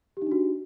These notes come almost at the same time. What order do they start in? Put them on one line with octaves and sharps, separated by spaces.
G4 D#4 D4 F#4